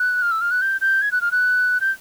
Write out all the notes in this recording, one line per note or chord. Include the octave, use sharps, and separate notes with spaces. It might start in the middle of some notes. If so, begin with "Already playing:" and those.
Already playing: F#6
F6
E6
F6
F#6
G6
G6
G#6
F#6
F6
F#6
G6